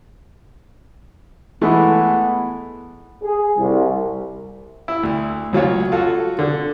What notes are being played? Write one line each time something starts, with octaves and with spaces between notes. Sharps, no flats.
E3 G#3 A3 B3
G#4
C2
E4
D2
C#2 F#3 F4 C#5
F4 F#4 A4
D3